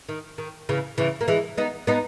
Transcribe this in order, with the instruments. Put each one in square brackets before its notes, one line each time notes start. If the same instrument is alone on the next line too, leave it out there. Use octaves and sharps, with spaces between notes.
[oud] D#3
D#3
C#3 E3
C#3 E3
A#3
E3 G#3
B3 D#4
B3 D#4